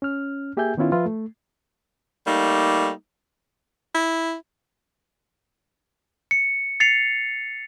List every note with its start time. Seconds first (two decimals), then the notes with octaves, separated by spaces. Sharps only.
0.02 C#4 F6
0.57 A#3 G4 G#4 E5 G#5 G6
0.78 D#3 B3 C#4 E4 F4
0.92 F3 F4 B4 E5
1.06 A3
2.27 G3 A3 A#3 D#4
3.95 E4
6.31 C#7
6.80 A6 C7 C#7 F7